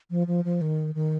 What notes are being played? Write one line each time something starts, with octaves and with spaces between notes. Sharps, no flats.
F3
F3
F3
D#3
D#3